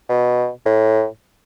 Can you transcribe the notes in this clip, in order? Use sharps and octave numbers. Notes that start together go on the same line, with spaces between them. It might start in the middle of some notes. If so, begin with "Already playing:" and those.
B2
A2